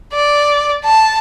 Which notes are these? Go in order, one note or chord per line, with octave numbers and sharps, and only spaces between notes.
D5
A5